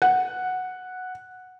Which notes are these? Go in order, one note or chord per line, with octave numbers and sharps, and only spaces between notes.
F#5